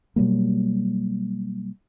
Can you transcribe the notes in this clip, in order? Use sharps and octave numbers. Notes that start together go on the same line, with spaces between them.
B2 F#3 G3 A#3